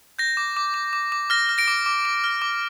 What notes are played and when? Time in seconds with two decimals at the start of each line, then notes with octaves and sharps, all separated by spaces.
0.19 G6 A#6
0.37 D6
0.57 D6
0.74 D6
0.93 D6
1.12 D6
1.30 F6 A#6
1.49 F6
1.58 A#6 D7
1.68 D6
1.86 D6
2.05 D6
2.24 F6
2.42 D6